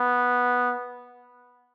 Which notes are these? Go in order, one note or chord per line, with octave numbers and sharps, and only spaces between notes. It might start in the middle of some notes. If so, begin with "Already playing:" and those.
Already playing: B3